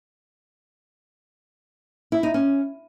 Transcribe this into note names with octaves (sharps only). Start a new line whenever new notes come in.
E4
D#4
C#4